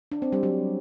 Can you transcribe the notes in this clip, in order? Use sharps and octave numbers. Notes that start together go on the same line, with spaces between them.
D4
C4
G3
F#3